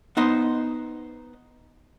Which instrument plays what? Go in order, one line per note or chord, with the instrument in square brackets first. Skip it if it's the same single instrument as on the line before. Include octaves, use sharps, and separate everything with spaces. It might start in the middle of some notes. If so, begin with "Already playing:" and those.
[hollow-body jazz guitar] B3 D#4 C5 D#5